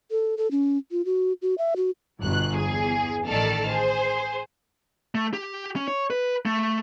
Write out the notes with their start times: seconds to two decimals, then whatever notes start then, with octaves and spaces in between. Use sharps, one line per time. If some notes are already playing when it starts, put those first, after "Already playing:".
0.11 A4
0.37 A4
0.51 C#4
0.91 F4
1.05 F#4
1.42 F#4
1.58 E5
1.76 F#4
2.20 G1 B2 F#6
2.56 E2 G#4
3.27 A1 D#3 A4 D5 A5 F6
3.69 G#4 C5
5.15 A3
5.34 G4
5.76 C#4
5.88 C#5
6.10 B4
6.46 A3